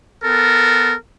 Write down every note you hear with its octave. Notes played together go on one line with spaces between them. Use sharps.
B3 A4 A#4